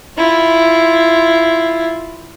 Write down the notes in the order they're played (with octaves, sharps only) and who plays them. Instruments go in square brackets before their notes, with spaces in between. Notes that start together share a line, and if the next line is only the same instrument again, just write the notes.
[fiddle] E4 F4